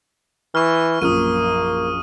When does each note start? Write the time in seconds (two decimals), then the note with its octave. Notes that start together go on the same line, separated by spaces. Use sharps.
0.55 E3 C#6 F6
1.02 A#1 F#2 F3 A#3 D#6 F6 D#7